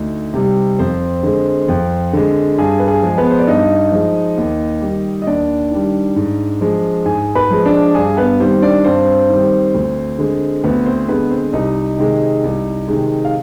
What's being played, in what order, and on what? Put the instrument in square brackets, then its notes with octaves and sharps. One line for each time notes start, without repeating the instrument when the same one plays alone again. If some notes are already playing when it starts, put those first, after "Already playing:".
Already playing: [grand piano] D2 D#4
C3 G3
F2 C4 C5
D3 G#3
F2
D3 G#3
G2 G#4
B4
G#4
F3 G#3
B3 B4
C5
D5
G2 D#4 D#5
F3 G#3
D#2
D#3 G3
D#5
D#2 D4 D5
D#3 G3
G#2
F3 G#3
G#2 G#4 G#5
B4 B5
F3 G#3
D4 D5
G2 G#4
B3 B4
D#3 G3 C4 C5
D4 D5
G2 C4 C5
D#3 G3
D2
D3 G#3
D2 B3 B4
C4 C5
D3 G#3 B3 B4
C4 C5
C2 D#4 D#5
C3 D#3 G#3
C2
C3 D#3 G#3
F5